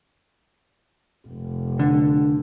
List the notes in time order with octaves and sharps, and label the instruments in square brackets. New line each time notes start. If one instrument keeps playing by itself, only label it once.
[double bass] F1
[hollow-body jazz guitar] D3